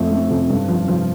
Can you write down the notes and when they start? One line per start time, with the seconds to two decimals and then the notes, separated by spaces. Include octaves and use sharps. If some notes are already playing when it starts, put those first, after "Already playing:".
Already playing: F2 A3
0.11 A3
0.31 F2
0.50 G2
0.68 F3
0.88 F3